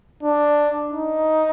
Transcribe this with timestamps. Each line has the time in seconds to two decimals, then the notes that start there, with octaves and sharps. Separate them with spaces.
0.23 D4
0.91 D#4